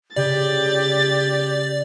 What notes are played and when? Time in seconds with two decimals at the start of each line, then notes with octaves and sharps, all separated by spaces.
0.16 C#3 G4 D5 A6